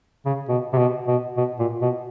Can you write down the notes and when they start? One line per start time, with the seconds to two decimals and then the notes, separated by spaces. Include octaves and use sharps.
0.26 C#3
0.49 B2
0.73 C3
0.78 B2
1.07 B2
1.37 B2
1.59 A#2
1.82 B2